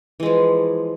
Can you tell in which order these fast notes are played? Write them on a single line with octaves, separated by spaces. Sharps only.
E3 G#3 F3